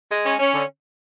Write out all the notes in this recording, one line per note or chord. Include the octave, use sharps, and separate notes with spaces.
G#3
C#4
C#4
D3